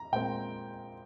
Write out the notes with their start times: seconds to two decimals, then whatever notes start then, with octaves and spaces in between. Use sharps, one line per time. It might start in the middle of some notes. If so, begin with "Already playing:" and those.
Already playing: A#5
0.12 A#2 G#3 C4 G5